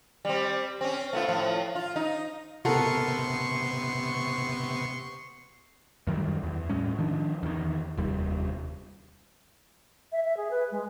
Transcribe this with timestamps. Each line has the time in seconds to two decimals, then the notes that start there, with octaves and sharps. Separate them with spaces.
0.25 G3 C4
0.81 C4 C#4
1.13 A3 B3 F4
1.28 A2 F3
1.75 F4
1.96 D#4
2.65 C3 B3 A4 A#4 F#5 C6 C#6
6.07 F#2 D#3 G3
6.43 E2
6.69 A2 G3 G#3 C#4
6.98 D#3 F3 D4
7.43 E2 D#3
7.97 F1 D#2 G3
10.12 E5
10.25 E5
10.37 G#4
10.51 B4
10.72 G#3